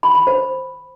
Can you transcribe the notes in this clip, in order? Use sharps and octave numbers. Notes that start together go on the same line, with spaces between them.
B5
B5
C5